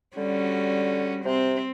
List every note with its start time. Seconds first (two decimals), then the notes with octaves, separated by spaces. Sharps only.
0.17 D3 G3 C#4 F#4
1.25 C3 C4